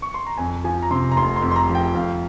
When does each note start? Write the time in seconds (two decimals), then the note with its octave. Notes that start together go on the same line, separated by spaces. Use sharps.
0.02 C#6
0.14 C6
0.27 A#5
0.38 F2 G#5
0.64 F3 G#5
0.82 A#5
0.91 C3 C6
1.11 A#5
1.17 F1 C6
1.36 C6
1.42 F2
1.51 C6
1.56 A#5
1.69 F3
1.75 G5
1.94 F2 F5